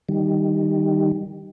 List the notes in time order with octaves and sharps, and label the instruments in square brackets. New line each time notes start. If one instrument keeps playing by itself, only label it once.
[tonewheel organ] D#3 G3